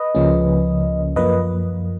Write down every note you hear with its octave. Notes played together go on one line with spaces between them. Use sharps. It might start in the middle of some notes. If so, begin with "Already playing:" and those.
Already playing: B4 D#5
C#2 C#3 F3 A#3 C#4
F#2 F3 A#3 B4 D#5